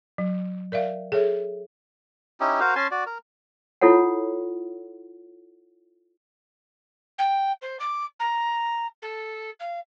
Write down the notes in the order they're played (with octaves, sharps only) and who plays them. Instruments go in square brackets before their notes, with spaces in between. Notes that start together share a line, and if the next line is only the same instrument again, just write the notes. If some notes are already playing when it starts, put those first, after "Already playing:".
[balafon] F#3
A#4 D5 E5 F5
G#4 A4 C#5 E5
[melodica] C#4 D#4 E4 G4
F#4 A#4 C5 F5
C#4 G#5 A5 C6
F#4 D5
A#4
[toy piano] E4 F4 A4 C#5 F#5
[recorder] G5
C5
D6
A#5
A4
F5